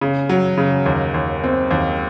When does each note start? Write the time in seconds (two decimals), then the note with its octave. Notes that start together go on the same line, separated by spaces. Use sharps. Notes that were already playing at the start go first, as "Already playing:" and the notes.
0.01 C#3
0.29 F#3
0.58 C#3
0.86 D#2
1.14 D#2
1.44 C4
1.71 D#2